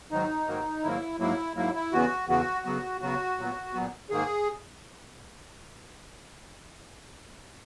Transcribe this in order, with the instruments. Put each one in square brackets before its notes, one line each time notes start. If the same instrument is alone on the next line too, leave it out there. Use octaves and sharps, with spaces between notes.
[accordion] G#2 D#3 F#3 D#4
G#2 D#3 F#3 A#3
G#2 D#3 F#3 A#3 E4
G#2 F#3 A#3 E4
G#2 F#3 A#3 E4
E4
E2 C#3 E3 B3 F#4
E2 C#3 E3 B3 F#4
C#3 F#3 B3
C#3 F#3 B3 F#4
A#2 F#3 B3
A#2 F#3 B3
G#2 D#3 A#3 G#4